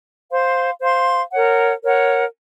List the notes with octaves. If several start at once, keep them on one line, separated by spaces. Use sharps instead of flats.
C5 F5 C6
C5 F5 C6
A#4 C#5 F#5
A#4 C#5 F#5